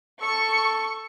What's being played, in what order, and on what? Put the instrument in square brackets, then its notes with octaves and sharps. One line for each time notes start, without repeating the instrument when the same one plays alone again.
[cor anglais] A4 [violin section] C#6